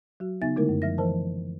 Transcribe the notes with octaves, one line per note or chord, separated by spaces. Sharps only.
F#3 F#4
C#3 B3 D#4 E5 G#5 A6
D3 G#3 A3 D#4 E4 A#4
F#2
F3 E5 A#6
E3 F3 A#4 C5 A5